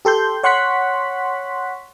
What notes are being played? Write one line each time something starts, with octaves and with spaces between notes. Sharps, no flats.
G4 A4 C6 G6
C#5 F#5 C6 C#6 F#6 B6